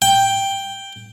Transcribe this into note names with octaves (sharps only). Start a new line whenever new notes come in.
G5